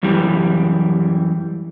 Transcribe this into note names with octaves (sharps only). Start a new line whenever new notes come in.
F#2 E3 G3